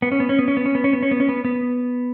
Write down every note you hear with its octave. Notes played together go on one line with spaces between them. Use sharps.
B3
C#4
B3
C#4
B3
C#4
B3
C#4
B3
C#4
B3
C#4
B3
C#4
B3
B3